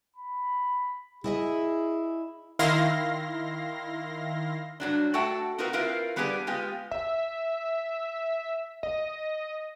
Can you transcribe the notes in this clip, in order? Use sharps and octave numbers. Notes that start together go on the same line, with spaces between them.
B5
E4 G#4 D#5 E5
D#3 E4 F5 C6 A#6
G2 F#3 D4
A3 F#4 A4 F#5 G5 A5
C4 D#4 F4 F#4 A#4 B4
C4 E4 F4 A#4 B4 F5
G3 B3 D4 G4 G#4 B4
G#3 B3 F4 G4
E5
D#5